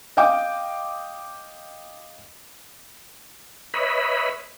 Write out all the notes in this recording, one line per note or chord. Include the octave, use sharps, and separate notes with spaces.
D#5 F5 G5 D6
B4 C#5 D#5 E5 B5